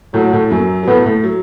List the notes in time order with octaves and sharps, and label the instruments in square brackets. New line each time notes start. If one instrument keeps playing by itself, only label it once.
[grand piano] A2 A3 [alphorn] F#3
[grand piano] A2 A3
F#2 F#3
F#3
[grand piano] A2 A3 [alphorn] B3
[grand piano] A2 A3
F#3